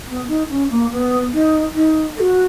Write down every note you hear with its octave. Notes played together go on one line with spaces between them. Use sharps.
B3
D#4
C#4
A#3
B3
D#4
D#4
A#4
F#4